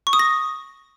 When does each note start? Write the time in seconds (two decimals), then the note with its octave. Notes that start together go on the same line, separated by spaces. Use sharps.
0.07 C#6
0.13 D#6
0.19 A#6